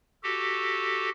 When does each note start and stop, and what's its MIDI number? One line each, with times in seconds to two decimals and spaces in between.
0.23 1.10 66
0.23 1.10 67
0.23 1.10 69